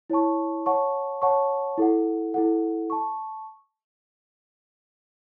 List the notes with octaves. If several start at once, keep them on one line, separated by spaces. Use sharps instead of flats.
E4 C#5 A5 C#6
C#5 F#5 A5 C#6
C#5 F#5 A5 C#6
E4 A4 F#5
E4 A4 F#5
A5 C#6